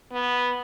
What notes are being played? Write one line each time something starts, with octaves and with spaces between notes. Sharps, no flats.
B3